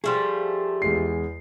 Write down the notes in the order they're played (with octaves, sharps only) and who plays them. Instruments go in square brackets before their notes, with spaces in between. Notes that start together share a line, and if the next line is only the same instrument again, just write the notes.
[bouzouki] F3 G3 A3 [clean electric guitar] G#4
[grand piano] E2 G#3 C7